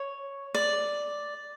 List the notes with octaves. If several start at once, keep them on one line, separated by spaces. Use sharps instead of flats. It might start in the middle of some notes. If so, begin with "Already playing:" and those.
Already playing: C#5
D5